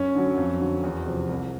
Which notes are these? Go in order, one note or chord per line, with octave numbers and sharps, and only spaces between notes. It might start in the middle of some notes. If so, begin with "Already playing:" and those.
Already playing: F#2 C#4
D3 F#3
F2
D3 F#3
E2
C3 F3
C2